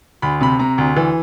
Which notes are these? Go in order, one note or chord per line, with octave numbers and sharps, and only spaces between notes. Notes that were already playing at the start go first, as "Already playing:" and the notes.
D2 B5
C3 B5
C3 A#5
D2
E3